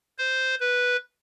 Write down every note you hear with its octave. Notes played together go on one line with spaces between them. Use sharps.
C5
B4